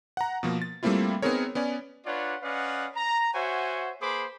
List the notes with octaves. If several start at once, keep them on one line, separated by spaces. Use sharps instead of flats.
F#5 A#5
B2 F3 A#3
A6
G3 A3 A#3 C4 E4 F4
B3 C4 D#4 G#4 A#4 C#5
B3 C#4 D5 G#5
D4 F4 B4 C#5 D5 F#5
C#4 B4 D5 D#5 F5 F#5
A#5
F#4 C5 C#5 E5 F#5 G#5
A#3 G#4 B4 C5 B5 D6